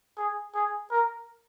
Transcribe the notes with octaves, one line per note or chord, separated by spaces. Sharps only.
G#4
G#4
A#4